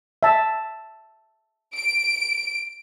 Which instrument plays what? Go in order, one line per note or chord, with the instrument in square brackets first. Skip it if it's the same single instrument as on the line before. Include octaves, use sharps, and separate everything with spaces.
[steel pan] E5 A5
[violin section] D7